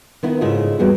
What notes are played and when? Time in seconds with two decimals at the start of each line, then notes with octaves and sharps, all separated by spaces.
0.23 D#3 B3 E4
0.41 G#2 C#3 E4 F4 A4 D#5
0.79 E2 G3 B3 F#4 G#4